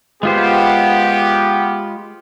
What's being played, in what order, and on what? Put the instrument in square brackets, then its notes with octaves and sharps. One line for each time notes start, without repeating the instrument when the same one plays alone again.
[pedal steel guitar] G#3 F4 C5 [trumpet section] B3 G4